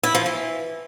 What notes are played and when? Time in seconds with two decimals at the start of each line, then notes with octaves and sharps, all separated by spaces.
0.03 E4
0.15 F3
0.26 E3